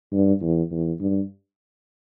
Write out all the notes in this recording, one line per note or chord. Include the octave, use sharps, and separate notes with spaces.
G2
E2
E2
G2